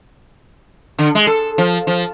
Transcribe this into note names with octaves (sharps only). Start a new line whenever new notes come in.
D3
G#3
A4
F3
F3